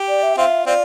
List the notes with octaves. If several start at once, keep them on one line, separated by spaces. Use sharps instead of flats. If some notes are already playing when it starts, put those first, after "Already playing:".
Already playing: G4
D5
E5
C4 F4 E5
C4 F4 D5